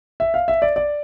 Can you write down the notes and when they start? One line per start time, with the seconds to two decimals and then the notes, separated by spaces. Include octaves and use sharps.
0.20 E5
0.34 F5
0.48 E5
0.62 D5
0.76 D5